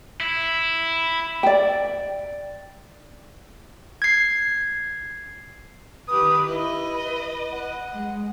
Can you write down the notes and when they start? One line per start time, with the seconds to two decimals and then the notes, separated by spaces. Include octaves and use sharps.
0.20 E4
1.43 D5 G5
4.02 G#6 C7
6.08 D#3 G4 B4 D#6
6.47 E4 B4 D#5
7.52 F#5
7.93 G#3